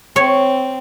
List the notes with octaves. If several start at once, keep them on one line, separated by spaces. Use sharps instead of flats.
C4 C#5